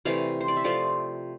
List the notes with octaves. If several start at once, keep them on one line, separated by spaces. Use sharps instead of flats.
C3 E3 A3 D5 F5
C5
D5
E5
F3 A3 C4 F4 D5 F5